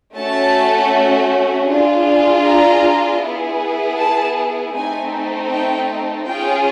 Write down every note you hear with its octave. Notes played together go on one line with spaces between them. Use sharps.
A3 C#4 F#4 A5
D4 F4 G#4
A#5
B3 E4 G#4
A5
A3 C4 D#4 G#5
G5
C#4 F4 G#4 G5